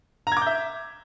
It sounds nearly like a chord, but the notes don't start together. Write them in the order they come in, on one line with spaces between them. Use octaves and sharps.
A#5 G#6 D6 G6 E5